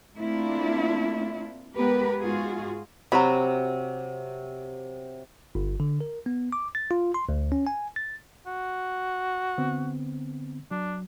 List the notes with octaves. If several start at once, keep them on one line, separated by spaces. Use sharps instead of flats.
A3 A#3 C4 D4 E4 F4
G#3 B3 G4 A#4 B4
G#2 F4 F#4 G#4
C3 F#3 F#4 B5
G1
D3
A#4
B3
D6
A6
F4
C6
D2
C#4
G#5
A6
F#4
D3 B3 C4
F#3 D4